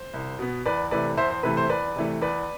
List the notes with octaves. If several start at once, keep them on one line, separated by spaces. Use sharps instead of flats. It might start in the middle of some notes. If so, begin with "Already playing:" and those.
Already playing: C5
C2
B2 B3
E2 B4 D5
C3 E3 A3 B4 D5
E2 C5 E5
C5
C3 E3 A3 B4
C5
E2 B4 D5
C3 E3 A3
E2 B4 D5